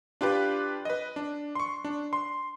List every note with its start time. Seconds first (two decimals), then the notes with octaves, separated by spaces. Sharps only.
0.21 D4 F4 G4 B4 B5
0.85 B4 D#5
1.16 D4
1.55 C6 C#6
1.84 D4
2.13 C6